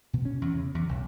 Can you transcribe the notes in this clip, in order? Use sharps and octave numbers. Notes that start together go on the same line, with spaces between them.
B2
C#4
E2
C#3
E2
B1